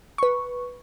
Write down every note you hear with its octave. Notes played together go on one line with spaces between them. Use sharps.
B4 C#6